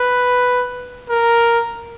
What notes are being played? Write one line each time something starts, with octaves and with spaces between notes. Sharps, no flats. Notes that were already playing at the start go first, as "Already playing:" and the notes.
Already playing: B4
A#4